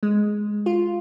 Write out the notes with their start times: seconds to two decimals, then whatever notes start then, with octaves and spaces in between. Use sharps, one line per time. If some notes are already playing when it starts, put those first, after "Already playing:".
0.03 G#3
0.66 F4